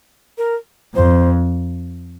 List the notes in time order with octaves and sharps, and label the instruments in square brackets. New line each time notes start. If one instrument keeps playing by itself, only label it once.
[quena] A#4
[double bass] F2 [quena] C5